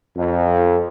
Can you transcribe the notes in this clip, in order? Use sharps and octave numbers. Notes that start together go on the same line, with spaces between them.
F2